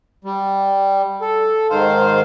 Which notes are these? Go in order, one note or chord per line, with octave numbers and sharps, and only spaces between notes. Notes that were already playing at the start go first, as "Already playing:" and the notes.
G3
A4
G#2 D#3 C5 F5